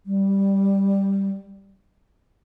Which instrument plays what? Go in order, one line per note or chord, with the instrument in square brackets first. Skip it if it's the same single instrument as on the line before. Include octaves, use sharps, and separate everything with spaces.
[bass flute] G3